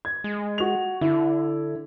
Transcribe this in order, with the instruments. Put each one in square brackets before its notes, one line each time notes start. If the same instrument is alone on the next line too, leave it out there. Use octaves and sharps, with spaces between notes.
[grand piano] G#6
[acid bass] G#3
[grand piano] F#4 F7
[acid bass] D3 [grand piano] E4